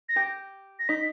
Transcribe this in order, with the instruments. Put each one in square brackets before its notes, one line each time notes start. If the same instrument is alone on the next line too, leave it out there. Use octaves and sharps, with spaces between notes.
[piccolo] A#6
[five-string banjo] G4
[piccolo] A#6
[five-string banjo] D#4 [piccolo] B6